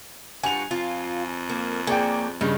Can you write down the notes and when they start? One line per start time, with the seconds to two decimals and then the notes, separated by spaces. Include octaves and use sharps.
0.43 G2 F4 F#4 G#5 F7
0.71 F2 F4
1.49 A#3
1.87 A#3 D4 G#4 C#5 D5 G5
2.41 G2 C#3 D#4